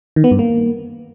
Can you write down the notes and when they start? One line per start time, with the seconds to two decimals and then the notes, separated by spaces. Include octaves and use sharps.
0.16 D#3
0.24 B3
0.31 G2
0.39 A#3